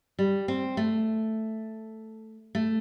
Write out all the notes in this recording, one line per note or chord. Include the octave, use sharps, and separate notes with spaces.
G3
C4
A3
A3